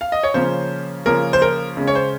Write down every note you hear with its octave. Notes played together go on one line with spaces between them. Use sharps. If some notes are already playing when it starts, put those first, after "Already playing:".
F5
D#5
C#5
C#3 F3 A#3 C#4 C5
C#3 F3 A#3 C#4 A#4
C5
A#4
C#3 G#3 C#4
C#5
C5